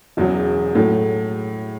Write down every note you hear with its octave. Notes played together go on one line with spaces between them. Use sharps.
E1 E2 C#3 F#3
A2 F#3 A3